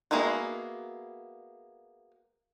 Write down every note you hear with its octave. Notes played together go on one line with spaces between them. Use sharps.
G#3 A#3 B3 E4 F#4